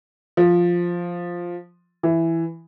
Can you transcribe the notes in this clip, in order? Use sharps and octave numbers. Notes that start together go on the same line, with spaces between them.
F3
E3